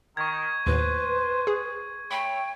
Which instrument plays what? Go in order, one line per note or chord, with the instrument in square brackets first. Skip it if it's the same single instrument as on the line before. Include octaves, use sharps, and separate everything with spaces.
[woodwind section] D#3 [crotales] C#6 G#6
[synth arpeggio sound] D#2 A2 [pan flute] B4 [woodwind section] C5
[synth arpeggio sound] G#4
[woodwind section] A3 C#5 [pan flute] G5 [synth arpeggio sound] B5 C6